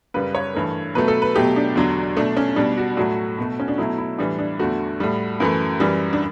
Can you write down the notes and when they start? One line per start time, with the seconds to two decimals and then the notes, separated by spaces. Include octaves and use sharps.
0.14 F#2 C#3 G3 B4
0.35 C#5
0.55 G2 E3 A3
0.95 B2 F#3 A3 B4
1.08 A4
1.22 B4
1.36 B2 F#3 A3 G4
1.56 D4
1.75 E2 D3 F#3
2.17 B2 A3 D4
2.37 C#4
2.56 B2 G3 D4
2.78 F#4
2.97 A2 F#3 A3 F#4
3.38 B2 A3
3.60 C#4
3.68 D4
3.78 B2 F#3 A3 E4
3.98 E4
4.18 A2 E3 G3 D4
4.39 D4
4.60 E2 D3 A3 F#4
5.00 A2 G3
5.40 F#2 E3 A3
5.80 F#2 E3 G3
6.13 D4